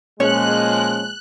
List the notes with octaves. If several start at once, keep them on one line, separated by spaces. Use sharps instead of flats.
A#2 F3 G#3 C#4 C#5 F#6